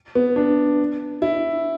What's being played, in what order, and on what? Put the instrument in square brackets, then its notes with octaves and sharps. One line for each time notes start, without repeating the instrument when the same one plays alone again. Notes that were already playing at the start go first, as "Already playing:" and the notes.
[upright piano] B3
D4
E4